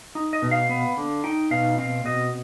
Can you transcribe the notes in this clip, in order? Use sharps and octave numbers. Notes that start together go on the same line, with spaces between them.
D#4
D#5
B2
F5
B3
D3
D#4 G5
B2 F5
C4 F5
B2 D#5